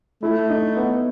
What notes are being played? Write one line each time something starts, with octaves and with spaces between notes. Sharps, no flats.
A3 E4
D#4
B3